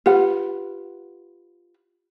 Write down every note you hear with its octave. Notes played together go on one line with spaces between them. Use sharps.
F4 G4 B4 F#5